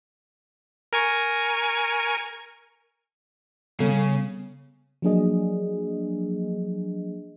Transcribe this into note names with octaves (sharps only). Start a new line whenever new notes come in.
A#4 G#5 C#6
C#3 G3 B3 A4
F3 F#3 A#3 D4 G#4 D#5